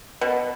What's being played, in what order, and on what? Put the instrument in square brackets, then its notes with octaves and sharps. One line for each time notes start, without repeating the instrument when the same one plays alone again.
[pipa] B2